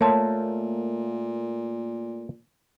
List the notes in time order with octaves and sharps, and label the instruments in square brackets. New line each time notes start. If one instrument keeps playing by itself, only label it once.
[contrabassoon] A#2 [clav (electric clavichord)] A3 A#3 [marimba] C#5 A5 C6